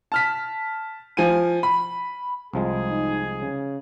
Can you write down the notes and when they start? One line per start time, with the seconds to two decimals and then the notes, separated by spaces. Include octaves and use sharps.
0.12 A5 F6 B6
1.17 F3 G#5 D#7
1.63 B5
2.54 C2 F3 G#3 G#4
2.89 D#4
3.41 C#3